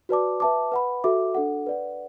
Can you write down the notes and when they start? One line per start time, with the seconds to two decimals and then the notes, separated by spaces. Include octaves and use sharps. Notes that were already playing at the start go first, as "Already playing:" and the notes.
0.09 F#4 B4 D5 A5 D6
0.40 B4 E5 A5 D6
0.72 B4 F#5 B5
1.04 F#4 A4 E5 D6
1.35 D4 A4 F#5
1.67 B4 D5 F#5